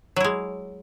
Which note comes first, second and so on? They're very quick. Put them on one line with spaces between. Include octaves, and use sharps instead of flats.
F#3 E4 G#3